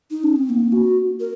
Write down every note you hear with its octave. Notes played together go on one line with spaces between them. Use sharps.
D#4
C#4
C4
A#3
F#4
A#4